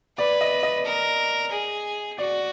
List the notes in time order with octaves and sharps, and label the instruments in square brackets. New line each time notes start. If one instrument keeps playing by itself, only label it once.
[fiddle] B4 [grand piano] D5
[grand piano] D#5
D#5
[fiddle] A#4
G#4
[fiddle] F#4 [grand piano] D5